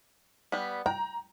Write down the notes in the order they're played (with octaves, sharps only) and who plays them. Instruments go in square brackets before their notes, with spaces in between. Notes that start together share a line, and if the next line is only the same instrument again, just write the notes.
[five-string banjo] G3 B3
[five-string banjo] G5 [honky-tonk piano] A#5